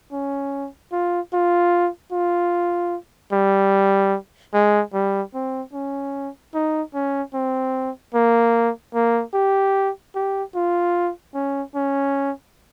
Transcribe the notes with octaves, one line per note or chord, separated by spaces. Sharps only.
C#4
F4
F4
F4
G3
G#3
G3
C4
C#4
D#4
C#4
C4
A#3
A#3
G4
G4
F4
C#4
C#4